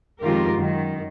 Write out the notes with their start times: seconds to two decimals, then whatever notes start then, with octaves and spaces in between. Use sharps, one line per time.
0.21 F2 D#3 G#3 F4 G4 A#4
0.55 F#2 D#3